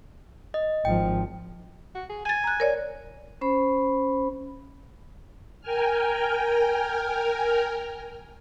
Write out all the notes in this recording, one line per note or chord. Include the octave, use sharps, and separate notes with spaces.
D#5
G#1 F3 G5
F#4
G#4
G#5 G#6 A6
A#5 F#6
A#4 C#5 D5
C#4 C5 B5
A#4 G5 G#5 F6